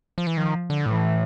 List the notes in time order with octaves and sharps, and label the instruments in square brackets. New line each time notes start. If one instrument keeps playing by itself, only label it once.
[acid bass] F3
E3
[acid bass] D#3 [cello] F3
[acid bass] D3
[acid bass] A2 [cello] E3